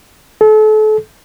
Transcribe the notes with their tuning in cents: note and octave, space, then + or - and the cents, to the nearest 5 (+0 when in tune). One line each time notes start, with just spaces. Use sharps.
A4 -35